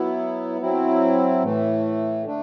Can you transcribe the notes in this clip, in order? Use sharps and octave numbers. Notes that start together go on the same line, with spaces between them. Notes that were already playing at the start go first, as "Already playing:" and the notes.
Already playing: F#3 B3 E4
F#3 C4 E4
A2 E3 A3
D3 A3 D4